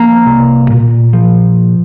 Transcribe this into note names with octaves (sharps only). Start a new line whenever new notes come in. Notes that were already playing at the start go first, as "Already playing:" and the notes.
Already playing: F3 A#3 A#5
C2
A#2
F3